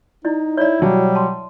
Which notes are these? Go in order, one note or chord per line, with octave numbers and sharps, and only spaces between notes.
D#4 E4 D5
E4 C#5 D5
B2 F#3 G3 E5 A5
A5 C6